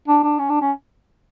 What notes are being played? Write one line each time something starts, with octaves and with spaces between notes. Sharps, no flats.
D4
D4
C#4
D4
C#4